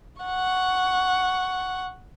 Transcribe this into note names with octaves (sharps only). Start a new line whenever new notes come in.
F#5 C#6